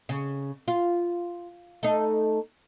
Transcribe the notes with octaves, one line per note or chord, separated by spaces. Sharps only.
C#3
F4
A3 D#4